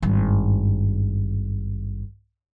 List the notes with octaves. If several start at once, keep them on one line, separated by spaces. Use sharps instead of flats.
G#1 G2